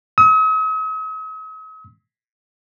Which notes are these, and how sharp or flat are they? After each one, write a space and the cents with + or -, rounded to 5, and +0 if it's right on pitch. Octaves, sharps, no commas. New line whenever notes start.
D#6 +45